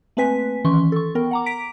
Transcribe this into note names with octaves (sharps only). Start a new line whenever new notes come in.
A3 A#3 C4 B4 G#5 B6
D#3 E3 C#4 C6 C#6
A4 C#6
B3 A#4 G5
F#5 A#5 D6
A#5 B6 D7